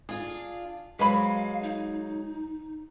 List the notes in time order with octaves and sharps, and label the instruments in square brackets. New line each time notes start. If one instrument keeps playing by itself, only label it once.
[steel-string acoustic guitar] D4 F4 [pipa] G#4
[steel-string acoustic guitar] F#3 G#3 [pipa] B4 C5 B5 [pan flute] F5
[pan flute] D#4